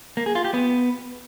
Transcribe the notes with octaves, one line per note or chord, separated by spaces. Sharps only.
A#3
G#4
F4
G4
B3